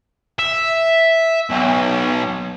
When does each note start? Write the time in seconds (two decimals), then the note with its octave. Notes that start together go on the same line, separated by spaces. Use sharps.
0.39 E5
1.50 B1